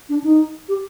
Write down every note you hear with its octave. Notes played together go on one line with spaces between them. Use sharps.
D4
D#4
G4